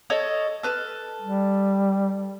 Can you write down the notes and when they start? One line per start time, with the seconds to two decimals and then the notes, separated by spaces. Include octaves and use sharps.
0.10 A4 C#5 D#5
0.63 A4 B4 F6
1.22 G3